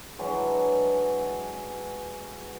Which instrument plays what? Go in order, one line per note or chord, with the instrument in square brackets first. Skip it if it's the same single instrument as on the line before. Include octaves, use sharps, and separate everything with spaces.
[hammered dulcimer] E3 F#3 G#3 D4